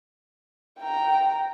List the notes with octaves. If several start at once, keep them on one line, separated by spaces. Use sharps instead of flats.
G5 A#5